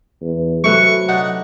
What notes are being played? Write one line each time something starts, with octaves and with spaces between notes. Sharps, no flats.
E2
C3 F#3 A3 B4 C#6
D4 D#4 G4 F#5